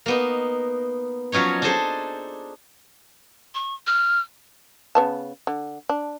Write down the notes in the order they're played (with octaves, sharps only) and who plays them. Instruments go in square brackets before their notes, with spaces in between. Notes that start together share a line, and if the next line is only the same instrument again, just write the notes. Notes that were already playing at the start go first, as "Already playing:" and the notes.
[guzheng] A#3 B3 D#4
F3 F#3 C#4 D#4 C#5
D4 D#4 G#4 A4 C5
[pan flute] C#6
F6
[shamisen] C#3 B3 A5
D3
D4